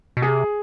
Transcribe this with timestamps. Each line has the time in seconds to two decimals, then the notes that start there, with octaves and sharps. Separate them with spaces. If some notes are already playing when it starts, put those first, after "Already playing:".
0.17 B2
0.22 C3 G#4